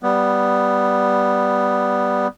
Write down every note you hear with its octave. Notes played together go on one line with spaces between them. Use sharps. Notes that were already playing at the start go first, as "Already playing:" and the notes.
G3 B3